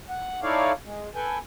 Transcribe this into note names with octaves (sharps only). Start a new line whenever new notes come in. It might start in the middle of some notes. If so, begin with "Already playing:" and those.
F#5
D#4 E4 A4 C#5 D5 F5
G#3
A4 B4 G5 G#5